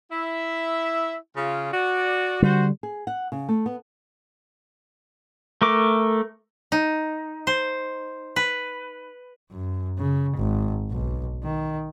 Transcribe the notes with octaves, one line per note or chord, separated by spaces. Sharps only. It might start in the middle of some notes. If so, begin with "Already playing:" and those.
E4 E5
C#3 F4
F#4 D5
D3 G3 F#4 C5
G#4
F#5
C#3
A3
B3
A3 A#4 D6
D#4
C5
B4
F#2
C#3
G#1
B1
D#3